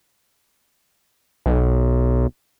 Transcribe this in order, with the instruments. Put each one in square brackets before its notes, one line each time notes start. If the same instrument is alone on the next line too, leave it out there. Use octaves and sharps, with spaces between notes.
[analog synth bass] B1